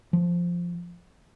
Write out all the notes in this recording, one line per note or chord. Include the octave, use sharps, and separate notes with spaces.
F3